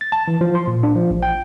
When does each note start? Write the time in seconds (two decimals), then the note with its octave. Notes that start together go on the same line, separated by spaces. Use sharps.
0.01 A6
0.12 A5
0.28 E3
0.41 F3
0.55 C6
0.67 A#2
0.83 D4
0.96 F3
1.11 A1
1.23 G5